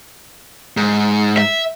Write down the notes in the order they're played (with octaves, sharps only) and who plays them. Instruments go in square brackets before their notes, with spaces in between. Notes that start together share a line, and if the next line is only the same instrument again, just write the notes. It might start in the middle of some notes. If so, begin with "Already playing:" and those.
[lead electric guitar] G#2
[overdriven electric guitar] E5